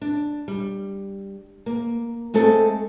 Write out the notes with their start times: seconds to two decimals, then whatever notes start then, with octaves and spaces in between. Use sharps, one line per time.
0.01 D4
0.48 G3
1.66 A#3
2.34 G#3 A3 C4 A4